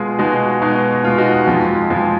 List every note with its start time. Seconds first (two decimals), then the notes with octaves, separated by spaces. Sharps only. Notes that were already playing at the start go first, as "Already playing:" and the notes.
Already playing: B2 G#3 F4 G#4
0.19 B2 G#3 D#4 F#4
0.62 B2 G#3 D#4
1.04 B2 G#3 F4
1.18 D#4 F#4
1.34 D#4
1.47 F2 F3 G#3 F4
1.90 F2 F3 G#3